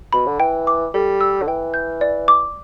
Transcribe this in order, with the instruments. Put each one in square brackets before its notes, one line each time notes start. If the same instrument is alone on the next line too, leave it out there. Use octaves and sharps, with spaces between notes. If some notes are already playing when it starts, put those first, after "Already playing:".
[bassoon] B2 [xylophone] B5
[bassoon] D3
[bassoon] E3 [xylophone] G5
[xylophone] D6
[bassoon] G3 [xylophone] A4
[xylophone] E6
[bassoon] D3
[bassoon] E3 [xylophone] G5
[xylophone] G6
D5
D6